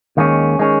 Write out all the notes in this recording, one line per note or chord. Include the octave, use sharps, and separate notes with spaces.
D#2 D#3 G#3 C#4
D#3 G#3 C#4